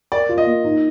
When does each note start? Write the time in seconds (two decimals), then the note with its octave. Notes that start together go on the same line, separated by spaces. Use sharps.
0.12 A#4 D5
0.29 F4
0.38 D#5
0.46 A#3
0.64 D#4